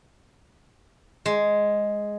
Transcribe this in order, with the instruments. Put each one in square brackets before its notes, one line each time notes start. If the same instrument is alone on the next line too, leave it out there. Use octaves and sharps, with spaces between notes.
[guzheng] G#3